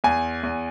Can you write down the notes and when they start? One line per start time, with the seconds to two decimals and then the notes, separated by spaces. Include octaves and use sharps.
0.04 E2 G#5
0.43 E2